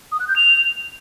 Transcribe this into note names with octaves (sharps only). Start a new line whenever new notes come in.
D#6
F#6
G6
F7